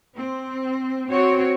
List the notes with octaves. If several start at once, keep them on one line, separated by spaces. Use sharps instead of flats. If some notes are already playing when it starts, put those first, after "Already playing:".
C4
C4 F#4 C#5